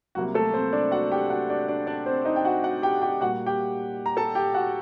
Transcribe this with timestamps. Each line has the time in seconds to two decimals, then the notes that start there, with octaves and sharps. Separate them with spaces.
0.15 C2 C3 F#3 A#3 F#4
0.34 A3 A4
0.54 C4 C5
0.73 D4 D5
0.91 F#4 F#5
1.11 G4 G5
1.30 F#4 F#5
1.50 D4 D5
1.68 D4 D5
1.87 D4 D5
2.06 C4 C5
2.25 D#4 D#5
2.36 G5
2.45 F#4 F#5
2.64 F#4 F#5
2.82 G4 G5
3.02 G4 G5
3.21 A#2 G3 A#3 F#4 F#5
3.46 G4 G5
4.06 A#5
4.17 A4 A5
4.35 G4 G5
4.54 F#4 F#5